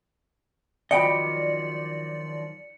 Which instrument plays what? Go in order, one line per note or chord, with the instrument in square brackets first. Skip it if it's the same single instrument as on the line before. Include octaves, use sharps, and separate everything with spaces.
[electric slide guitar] D#3 F3 F#3 [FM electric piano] D5 [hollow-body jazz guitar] D#5 G5 B5 [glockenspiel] C#7